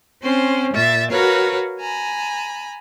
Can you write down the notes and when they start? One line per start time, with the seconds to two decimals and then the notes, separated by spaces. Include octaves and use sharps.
0.21 C4 C#4 C5
0.73 A#2 E5 A6
1.11 F#4 A#4 B4 C#5 F5
1.79 G#5 A#5 B5